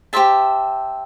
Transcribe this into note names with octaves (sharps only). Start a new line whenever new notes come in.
G4 C5 E5 A5